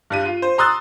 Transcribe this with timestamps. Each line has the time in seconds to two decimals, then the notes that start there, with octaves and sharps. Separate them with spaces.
0.10 G2 G3 D#7
0.25 F4
0.42 C5
0.58 A#5 C6 D#6 E6 F#6 A6